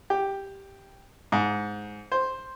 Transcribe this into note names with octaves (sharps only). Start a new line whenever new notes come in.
G4
G#2
C5